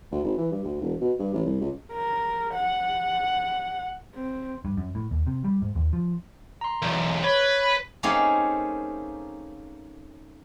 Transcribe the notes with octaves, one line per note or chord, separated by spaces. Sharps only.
D2
G#1
E3
G2
D2
E1
B2
G2
A1
C2
C#2
A#4
F#5
C4
G2
F#2
A2
D#2
C3
G3
G#2
D#2
F3
A#5 C6
B1 E2
B4 C#5
A3 A#3 C4 C#4 D#4 G#4